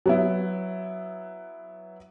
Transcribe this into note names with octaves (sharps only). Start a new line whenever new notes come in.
F#3 B3 E4